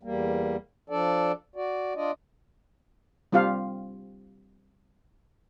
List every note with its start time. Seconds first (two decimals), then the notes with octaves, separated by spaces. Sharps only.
0.03 E2 G3 A#3
0.90 F3 D4 A4 D5
1.56 F#4 D5
1.95 D4 F4 D5 D#5
3.32 G3 C4 F4 G4 F5